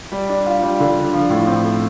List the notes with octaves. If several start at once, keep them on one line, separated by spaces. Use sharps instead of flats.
G3
D4
F4
G3
D3
D4
F3
A2
C4
A3